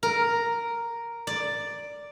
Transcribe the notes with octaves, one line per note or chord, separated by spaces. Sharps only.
A#4
D5